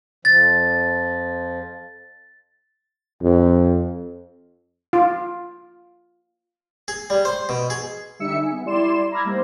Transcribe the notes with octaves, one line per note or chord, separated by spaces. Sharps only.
F2 F3 A6
F2
F4
G#4
G3
C5
B2
G#4
D3 G3 D#4 E5 E6 C#7
G#4
B3
G3 E4 D5 C6 E7
A#5 B5 D6 E6 F6 G#6
G3 A#3 D#4 C5